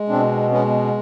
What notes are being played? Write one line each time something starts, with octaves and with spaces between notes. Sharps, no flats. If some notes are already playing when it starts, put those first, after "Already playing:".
Already playing: G#3
B2 C4 D4
G#3 B3 C#4